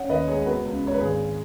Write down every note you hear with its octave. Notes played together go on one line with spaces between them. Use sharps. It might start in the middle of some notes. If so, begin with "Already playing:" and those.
Already playing: C#4 C#5 F#5
D#2 B4 D#5
G#3 G#4 C#5
B3 F#4 B4
C#2
G#3 C#5
B4
G#1 G#4